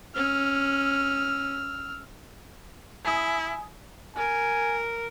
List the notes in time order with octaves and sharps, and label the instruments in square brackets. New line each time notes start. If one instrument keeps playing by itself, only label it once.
[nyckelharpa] C#4 [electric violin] E6 F6
[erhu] E4 [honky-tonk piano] G#5 D#6
[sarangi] A#4 [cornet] G#5